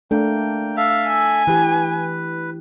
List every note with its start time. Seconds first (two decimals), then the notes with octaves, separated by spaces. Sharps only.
0.11 A3 A#3 D4 G5
0.77 A4 E5 F5
1.07 G#5
1.47 E3 G4 B4